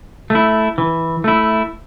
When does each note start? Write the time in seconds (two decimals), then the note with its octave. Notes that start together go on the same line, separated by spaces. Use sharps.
0.30 A3 E4
0.78 E3
1.24 A3 E4